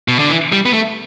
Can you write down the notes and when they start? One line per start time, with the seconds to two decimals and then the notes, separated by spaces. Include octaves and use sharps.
0.08 B2
0.19 D3
0.30 E3
0.52 G3
0.66 B3
0.73 A3